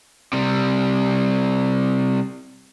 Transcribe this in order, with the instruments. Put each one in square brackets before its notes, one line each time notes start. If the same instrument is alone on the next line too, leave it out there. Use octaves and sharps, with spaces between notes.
[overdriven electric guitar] C3 G3